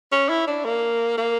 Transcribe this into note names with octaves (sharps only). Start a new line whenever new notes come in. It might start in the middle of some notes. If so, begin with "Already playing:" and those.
C#4
E4
D4
A#3
A#3